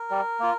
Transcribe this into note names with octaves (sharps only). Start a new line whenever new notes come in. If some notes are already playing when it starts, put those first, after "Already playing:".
Already playing: A#4
G3
A#3 F4